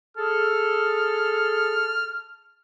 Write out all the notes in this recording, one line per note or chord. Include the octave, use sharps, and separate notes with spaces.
G#4 A4 F6